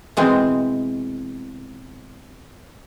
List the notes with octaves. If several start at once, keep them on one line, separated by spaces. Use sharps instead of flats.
B2 E3 G#3 C4